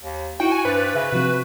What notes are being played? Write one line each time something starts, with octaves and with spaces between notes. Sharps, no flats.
D#2
D#4 E4 F#4 G5 C#7
G#5
G2 B4 C5 A6
C#3 E5 G#5 F#6
C3 F3 C4 F#4